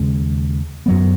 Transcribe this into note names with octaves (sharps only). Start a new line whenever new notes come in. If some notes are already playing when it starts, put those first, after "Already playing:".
Already playing: D#2 C#3 G#3 C#4
F#2 F#3 B3